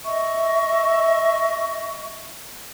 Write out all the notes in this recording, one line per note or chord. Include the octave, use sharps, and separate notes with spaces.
D#5 E5 C#6